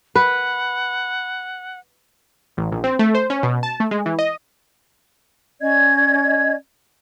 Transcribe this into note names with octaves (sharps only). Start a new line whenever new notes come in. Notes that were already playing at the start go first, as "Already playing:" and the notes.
B4 F#5
A1
A#1
C4
A3
C5
C#4
B2
A5
A3
G#3
E3
D#5
C#4 D5 D#5 G#6